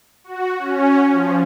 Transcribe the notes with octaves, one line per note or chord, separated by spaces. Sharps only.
F#4
C#4
F3